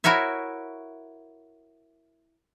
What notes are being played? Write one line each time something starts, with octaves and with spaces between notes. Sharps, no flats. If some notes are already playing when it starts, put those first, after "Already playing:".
E4 F#4 A#4 C#5 E5